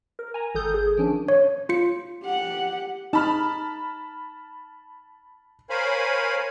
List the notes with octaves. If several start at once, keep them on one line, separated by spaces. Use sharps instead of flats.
A#4
G#5 A#5
G#1 A4 D#6 G6
G#4
D#3 F3 C#4 D4
C#5
F4 C#7
G4 F#5
D#4 A5 B5 F6
A#4 C5 C#5 F5 G#5 B5